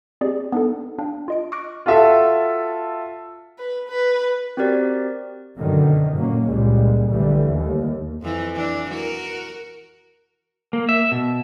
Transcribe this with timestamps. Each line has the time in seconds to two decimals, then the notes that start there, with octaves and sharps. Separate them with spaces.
0.21 C4 G4 G#4 D5 D#5
0.52 B3 D4 D#4 A4
0.98 D4 F5 G5
1.28 F4 D#5 D7
1.52 C#6 D6 F6 F#6 A#6 D7
1.86 F4 F#4 A4 E5 A5 E6
3.58 B4
3.88 B4
4.57 C4 F#4 G4 A#4 D5
5.58 F#2 B2 D3 D#3
6.15 A#2 F#3 A#3 C#4
6.47 C#2 A#2 G3 G#3
7.10 A#1 D3 E3 G3 A3
7.48 D#2
8.22 F2 E3
8.55 E3 D4
8.91 F#4 A#4
10.73 A#3
10.89 E5
11.12 B2